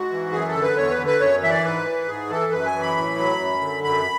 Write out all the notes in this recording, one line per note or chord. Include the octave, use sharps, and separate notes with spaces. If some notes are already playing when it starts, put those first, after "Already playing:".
Already playing: G#2 F#4
E3
F#2 G#4
A4
D3
B4
E2 C#5
B4
D3
B4
F#2 C#5
E3 E5
D5
G#2 B4
E3
G#2 G#4
E3 A4
F#2 B4
G#5
E3
B5
A2
F#3
F#2
D3
F#2 B5